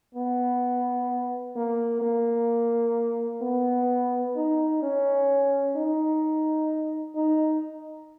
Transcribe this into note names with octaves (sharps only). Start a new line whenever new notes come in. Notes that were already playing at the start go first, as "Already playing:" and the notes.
B3
A#3
A#3
B3
D#4
C#4
D#4
D#4